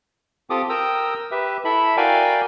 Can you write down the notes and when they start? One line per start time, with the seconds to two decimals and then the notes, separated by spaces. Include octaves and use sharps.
0.50 C4 F4 G4 A4 D6 D#6
0.69 A#4 G5 A#5 D#6 E6
1.31 G4 B4 E5
1.65 E4 A4 E5 B5
1.97 F#4 A#4 D5 F5 G5 G#5